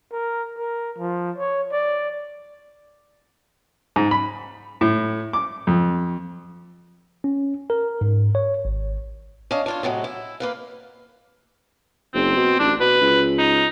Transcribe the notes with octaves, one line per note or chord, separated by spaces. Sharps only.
A#4
A#4
F3
C#5
D5
G#2
B5
A2
D6
F2
C#4
A#4
G#2
C#5
G#1
C#4 D4 D#5 F5
D4 F4 C#5
A2 C3 F#3 G#3
E4
A#3 B4 F5
F#1 C4
B2
A1 D4
B2 B4
C#2
D#4